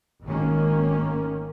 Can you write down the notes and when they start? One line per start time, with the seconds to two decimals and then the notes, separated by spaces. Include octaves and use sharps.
0.25 G#1 D#3 A#3 C#4